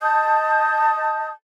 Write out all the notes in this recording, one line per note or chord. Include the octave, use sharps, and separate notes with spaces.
D#5 A5 D#6 G6